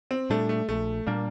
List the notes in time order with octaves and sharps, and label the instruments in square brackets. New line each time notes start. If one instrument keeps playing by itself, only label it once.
[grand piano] C4
[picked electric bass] A#2 G3 D4 [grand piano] A3
[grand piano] A3
[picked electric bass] A#1 [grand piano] A3
[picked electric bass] A#2 G3 D4 [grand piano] A#3